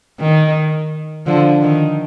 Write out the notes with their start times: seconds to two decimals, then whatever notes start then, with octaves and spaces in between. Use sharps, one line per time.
0.19 D#3
1.26 D3 F3
1.62 D#3